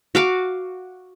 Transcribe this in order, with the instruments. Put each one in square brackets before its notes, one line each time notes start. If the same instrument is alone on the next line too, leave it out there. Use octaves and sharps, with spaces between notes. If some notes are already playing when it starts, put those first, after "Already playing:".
[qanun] F#4 F5 D6